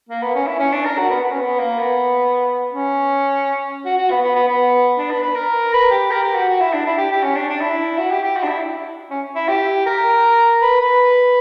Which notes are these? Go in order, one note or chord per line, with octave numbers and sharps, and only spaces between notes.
A#3
B3
C#4
E4
C#4
D4
A#4
F#4
B3
B3
C#4
B3
A#3
B3
C#4
F#4
F#4
B3
B3
B3
B3
D4
B4
B4
A#4
B4
G4
A#4
G4
F#4
F#4
E4
D4
E4
G4
G4
C#4
D4
D4
E4
F#4
G4
G4
F#4
D4
E4
C#4
E4
G4
A#4
B4
B4